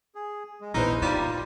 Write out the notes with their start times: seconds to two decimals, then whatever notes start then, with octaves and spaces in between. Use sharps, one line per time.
0.15 G#4
0.61 G#3
0.74 A#1 E2 D#4 E4 B4 C5 F6
1.02 G3 D#4 F4